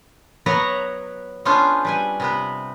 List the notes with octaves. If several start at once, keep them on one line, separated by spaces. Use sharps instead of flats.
F#3 B3 B4 C#5 F#5 A#5
B3 C#4 D4 F4 G#4 C5
G3 B4 G#5
C3 B3 B4